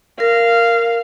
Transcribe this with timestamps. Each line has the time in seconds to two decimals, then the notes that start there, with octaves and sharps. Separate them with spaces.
0.20 A#4 F5